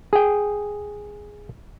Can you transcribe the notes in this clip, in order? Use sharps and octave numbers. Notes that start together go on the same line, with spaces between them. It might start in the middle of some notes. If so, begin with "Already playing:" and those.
G#4 G5